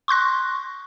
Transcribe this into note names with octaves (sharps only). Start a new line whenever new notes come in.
C6 C#6 F#6 A#6